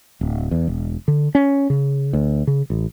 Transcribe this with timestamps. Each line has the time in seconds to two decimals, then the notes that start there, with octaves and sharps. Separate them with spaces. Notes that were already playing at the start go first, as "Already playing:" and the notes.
0.21 D1
0.51 E2
0.68 E1
1.08 D3
1.35 C#4
1.70 C#3
2.13 D2
2.47 C#3
2.70 A1